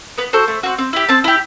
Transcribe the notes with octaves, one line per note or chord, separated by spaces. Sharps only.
B3 B4
F#4 A4 C5
A3
C4 F#4
C4
E4 G4
C4 A5
E4 G4